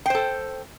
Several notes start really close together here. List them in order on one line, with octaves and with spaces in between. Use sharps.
G5 C5 A4